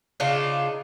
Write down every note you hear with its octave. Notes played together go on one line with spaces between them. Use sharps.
C#3 D4 D#4 F4